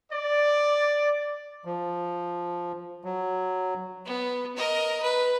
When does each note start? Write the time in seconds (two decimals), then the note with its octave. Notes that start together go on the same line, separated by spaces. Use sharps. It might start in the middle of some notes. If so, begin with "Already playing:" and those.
0.11 D5
1.65 F3
3.04 F#3
4.06 B3
4.56 A#4 D#5
5.02 B4